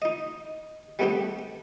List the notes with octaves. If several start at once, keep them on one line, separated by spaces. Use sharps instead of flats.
D#4 D#5
G3 A3 B3 C4 D4 G4